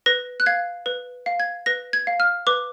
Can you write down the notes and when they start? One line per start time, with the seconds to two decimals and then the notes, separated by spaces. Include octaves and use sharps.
0.06 B4 A#6
0.40 F#6
0.46 F5 G#6
0.86 B4
1.26 F5
1.40 G#6
1.66 B4 A#6
1.93 G#6
2.07 F5
2.20 F6
2.47 B4 D6